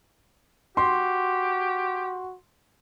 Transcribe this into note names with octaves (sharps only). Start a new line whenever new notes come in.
F#4 G4 C6